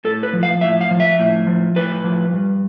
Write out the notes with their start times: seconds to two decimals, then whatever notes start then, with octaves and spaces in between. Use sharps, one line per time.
0.05 A2 A4
0.23 B4
0.33 F3
0.43 F5
0.61 A2 E5
0.81 F5
0.91 F3
1.00 E5
1.19 A2
1.47 F3
1.76 A2 B4
2.04 F3
2.33 G2